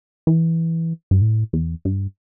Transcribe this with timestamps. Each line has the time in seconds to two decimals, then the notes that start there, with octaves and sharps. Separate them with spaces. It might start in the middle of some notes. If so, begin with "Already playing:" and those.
0.27 E3
1.11 G2
1.22 A2
1.53 E2
1.85 G2